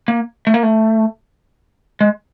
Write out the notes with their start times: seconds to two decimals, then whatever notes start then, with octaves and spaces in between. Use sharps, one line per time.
0.08 A#3
0.47 A3
0.54 A#3
0.63 A3
2.01 G#3